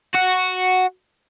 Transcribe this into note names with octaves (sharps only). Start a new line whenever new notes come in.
F#4